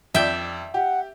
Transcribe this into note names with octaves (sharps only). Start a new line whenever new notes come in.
F2 D5 E5 G5
G4 F#5